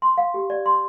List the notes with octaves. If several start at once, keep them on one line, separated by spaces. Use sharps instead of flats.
C6
F5
G4
D5
C6